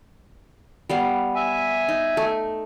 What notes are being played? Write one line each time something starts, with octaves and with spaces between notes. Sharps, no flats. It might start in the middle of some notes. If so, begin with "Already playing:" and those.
G3 B3 F5
E5 G#5
D#4
A3